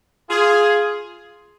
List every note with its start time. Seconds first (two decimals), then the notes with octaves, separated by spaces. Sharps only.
0.28 F4 G#4